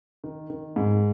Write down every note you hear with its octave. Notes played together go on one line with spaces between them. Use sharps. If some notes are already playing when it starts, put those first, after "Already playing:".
D#3
D#3
G#2